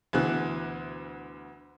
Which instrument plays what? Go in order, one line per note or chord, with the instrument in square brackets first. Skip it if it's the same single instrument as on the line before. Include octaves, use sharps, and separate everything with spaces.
[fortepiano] D2 B2 E3 F#6